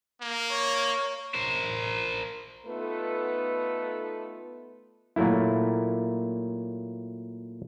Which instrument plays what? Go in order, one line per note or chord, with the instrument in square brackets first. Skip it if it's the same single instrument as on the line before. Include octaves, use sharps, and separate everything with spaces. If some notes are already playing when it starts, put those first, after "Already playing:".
[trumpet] A#3
[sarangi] C#5
[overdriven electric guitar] A#4 C5
[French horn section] A3 B3 D#4 F4 A4 B4
[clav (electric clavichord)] A#2 F#3 A3 A#3 E4